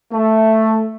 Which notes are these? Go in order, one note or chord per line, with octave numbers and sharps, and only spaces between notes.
A3